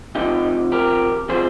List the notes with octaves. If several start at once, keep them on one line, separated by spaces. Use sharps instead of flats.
C3 F3 D#4 G4
G4 A#4
C3 F3 G#4 C5